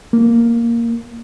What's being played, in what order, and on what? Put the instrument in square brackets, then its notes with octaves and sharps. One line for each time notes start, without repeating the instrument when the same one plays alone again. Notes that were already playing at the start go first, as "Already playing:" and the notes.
[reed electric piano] A#3